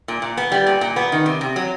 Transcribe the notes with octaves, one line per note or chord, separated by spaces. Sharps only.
A#2
A#2
B3
G3
A#2
A#2
B3
D#3
C3
C3
F#3